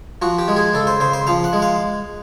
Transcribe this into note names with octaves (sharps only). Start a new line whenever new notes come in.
F3 F#4
G4
G#3
G#4
C#3 A4
C5
C#3 C5
C5
F3 F5
F#5
G#3
F5